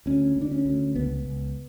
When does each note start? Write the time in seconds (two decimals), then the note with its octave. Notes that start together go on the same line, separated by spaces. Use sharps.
0.06 D2 C#4
0.36 D2
0.42 D4
0.52 C#4
0.66 D2
0.95 C#2 B3
1.25 C#2